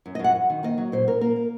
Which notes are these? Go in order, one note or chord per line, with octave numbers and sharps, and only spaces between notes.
F#2
D#5
F#2 F#5
F#2
D#3
A#3 D#5
F#3
A#2 C5
A#2 A#4
A#3 A#4
A#3